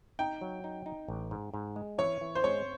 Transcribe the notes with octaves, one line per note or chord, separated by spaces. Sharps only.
D#4 G5
F#3
D#4
D#4
A1
G#2
G#2
G#3
E3 C#5
E3
C5
G#3 C#5